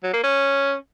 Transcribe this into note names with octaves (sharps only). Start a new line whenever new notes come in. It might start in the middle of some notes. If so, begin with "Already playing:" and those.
F#3
A#3
C#4